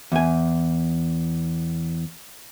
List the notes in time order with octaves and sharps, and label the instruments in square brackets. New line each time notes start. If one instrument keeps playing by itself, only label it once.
[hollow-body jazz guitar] E2 G#5